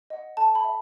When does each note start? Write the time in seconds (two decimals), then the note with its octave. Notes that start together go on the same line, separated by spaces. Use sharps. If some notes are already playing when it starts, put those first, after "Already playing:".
0.10 D#5 F#5
0.37 A4 A5
0.55 B5
0.64 E5